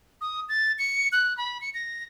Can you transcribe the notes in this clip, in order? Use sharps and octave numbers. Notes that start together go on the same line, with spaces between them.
D#6
A6
C#7
F#6
B5
C#7
A#6